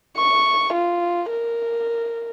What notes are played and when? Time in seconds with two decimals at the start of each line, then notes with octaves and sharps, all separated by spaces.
0.17 C#6
0.73 F4
1.30 A#4